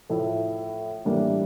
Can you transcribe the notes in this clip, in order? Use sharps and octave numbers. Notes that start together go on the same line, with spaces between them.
A2 F3 A3 E4
A2 E3 G3 A#3 D4